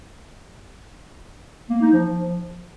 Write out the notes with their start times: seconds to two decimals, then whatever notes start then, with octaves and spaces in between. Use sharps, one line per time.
1.70 A#3
1.81 D#4
1.93 F3